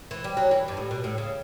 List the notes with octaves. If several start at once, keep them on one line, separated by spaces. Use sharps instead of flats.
E3
G3
F#3
E3
G2
A2
B2
A2
C#3